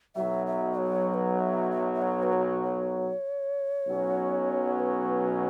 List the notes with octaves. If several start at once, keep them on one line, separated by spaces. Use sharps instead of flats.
B1 B2 F#3 E5
E5
C#5
C#5
B4
E5
E5
E5
C#5
B4
C#5
C#5
B1 B2 F#3 C#4 F#4
B4